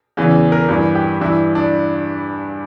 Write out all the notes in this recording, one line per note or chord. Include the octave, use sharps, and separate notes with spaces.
E2 C#3 E3
A#4
G2 E3
G4
G2 E3 E4
D4